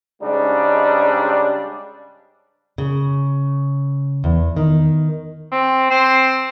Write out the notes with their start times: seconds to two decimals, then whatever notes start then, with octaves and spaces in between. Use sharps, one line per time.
0.22 G#2 C#3 G3 G#3 D4 D#4
2.78 C#3
4.24 E2
4.57 D#3
5.52 C4
5.90 C4 C5